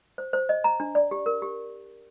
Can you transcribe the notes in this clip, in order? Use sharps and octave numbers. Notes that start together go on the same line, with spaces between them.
C5
C5
D#5
A#5
D4
D5
G4
A#4
G4